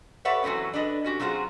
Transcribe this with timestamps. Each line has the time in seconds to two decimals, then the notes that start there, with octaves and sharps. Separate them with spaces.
0.25 G4 A4 B4 C#5 E5 F#5
0.43 E3 F#3 A3 C4 C#4
0.73 D4 A4 B4 D#5
1.04 C#4 F#4 G4
1.20 F#3 C4 F4 F#4 G#4